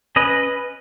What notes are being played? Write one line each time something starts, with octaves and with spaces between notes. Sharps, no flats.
C#4 B4 D#5